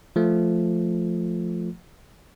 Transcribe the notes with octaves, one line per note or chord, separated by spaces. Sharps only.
F3 A3